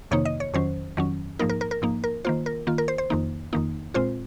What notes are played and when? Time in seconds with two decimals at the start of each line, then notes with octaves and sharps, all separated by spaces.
0.11 F2 C3 D#3 A#3 D#4 C#5
0.25 D#5
0.40 C#5
0.54 F2 D#3 F#3 C#4 C5
0.97 F2 D#3 F#3 C#4
1.39 G#2 F3 A#3 D#4 A#4
1.49 A#4
1.61 A#4
1.71 A#4
1.82 G#2 F3 A#3 D#4
2.04 A#4
2.25 D#3 A#3 F4 C5
2.46 A#4
2.67 D#3 A#3 F4
2.78 A#4
2.88 C5
2.98 C5
3.10 F2 D#3 A#3 D#4
3.53 F2 D#3 A#3 D#4
3.94 A#2 G#3 C4 F4 C5